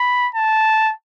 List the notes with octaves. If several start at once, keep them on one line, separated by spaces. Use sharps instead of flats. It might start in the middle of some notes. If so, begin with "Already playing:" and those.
Already playing: B5
A5